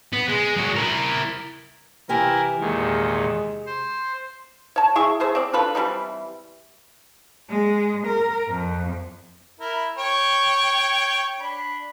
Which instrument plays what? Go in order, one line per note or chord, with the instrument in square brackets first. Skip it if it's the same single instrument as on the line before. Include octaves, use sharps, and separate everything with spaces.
[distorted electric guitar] B3
G#3
G#3 F#4
E4 A#4
[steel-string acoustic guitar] C3 G4 G#5 [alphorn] E3 [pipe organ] E4 A#4
[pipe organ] E2 A#2 D#3 [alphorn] G#3
[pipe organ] C5
[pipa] C#5 A5
E4 G#4 C#6
A3 G#4 C5
C4 D5
D4 F4 A4 B4
E3 G3 C4 D#4
[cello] G#3
A#4
F2
[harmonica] E4 A#4
C#5 G5
D4 B5